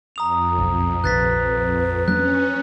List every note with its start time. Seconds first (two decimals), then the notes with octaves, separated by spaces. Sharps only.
0.16 F2 A#5 D#6 F7
0.58 F#1 B1
1.04 A#1 D#2 C3 B4 F#6 A6 B6
2.08 F#3 A#3 C#4 D4 F#6